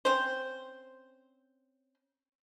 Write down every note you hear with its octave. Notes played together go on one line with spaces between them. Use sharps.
C4 C#4 C5